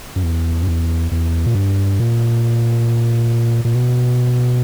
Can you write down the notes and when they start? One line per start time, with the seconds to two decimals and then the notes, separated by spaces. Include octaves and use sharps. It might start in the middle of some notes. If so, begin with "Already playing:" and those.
0.16 F#2
0.23 E2
0.63 F#2
0.67 E2
1.11 E2
1.46 A#2
1.55 G2
2.00 A#2
3.65 A#2
3.75 B2